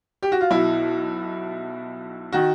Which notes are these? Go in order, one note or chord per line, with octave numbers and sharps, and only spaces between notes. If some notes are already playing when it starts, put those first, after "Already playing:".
G4
F#4
F4
B1 B2 E4
D#3 F#4